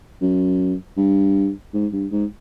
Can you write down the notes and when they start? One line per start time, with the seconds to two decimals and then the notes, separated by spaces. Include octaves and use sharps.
0.22 F#2
0.97 G2
1.74 G#2
1.93 G2
2.11 G#2